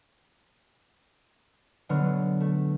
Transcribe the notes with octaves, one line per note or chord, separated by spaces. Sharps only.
B2 D3 F#3 B3 C#6 F6
A3